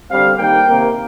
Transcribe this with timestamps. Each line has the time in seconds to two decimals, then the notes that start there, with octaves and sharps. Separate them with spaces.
0.11 D3 G3 C4 F5
0.38 D#3 G3 A#3 G5
0.66 C3 D#3 A#3